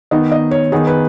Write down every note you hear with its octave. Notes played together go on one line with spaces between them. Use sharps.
D#3 B3 D#4 D#5
D#5
C#5
D#3 B3 D#4 G#4
B4